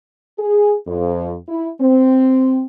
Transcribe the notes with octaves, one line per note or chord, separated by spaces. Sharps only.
G#4
F2
E4
C4